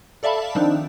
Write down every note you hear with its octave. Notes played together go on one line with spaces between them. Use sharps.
A4 D5 E5 F5 A5 B5
D#3 F3 C4 D4 D#4